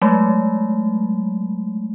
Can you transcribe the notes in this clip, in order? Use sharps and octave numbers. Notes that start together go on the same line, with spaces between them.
F#3 G#3 A3